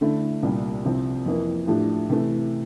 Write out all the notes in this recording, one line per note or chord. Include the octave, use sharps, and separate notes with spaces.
D3 A3 E4
C2 A#2 G3
C2 C3 F3 C4
F2 E3 A#3
A2 F3 A3 D4 G4
C3 E3 A3